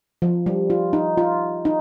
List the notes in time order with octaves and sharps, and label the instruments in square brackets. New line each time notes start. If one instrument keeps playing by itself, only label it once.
[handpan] F3
G3
F4
D#4
F4
D#4